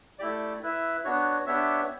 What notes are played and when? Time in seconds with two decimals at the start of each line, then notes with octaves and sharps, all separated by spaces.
0.19 A3 E4 G4 D5
0.62 E4 B4 E5
1.04 B3 D4 F#4 C#5
1.46 B3 D4 G4 C#5 E5